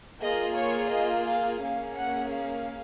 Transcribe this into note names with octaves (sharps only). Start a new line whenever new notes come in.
A#3 F4 G#4 D#5
C#5
D#5
F5
A#3 C#4 G#4 F5
F#5
F5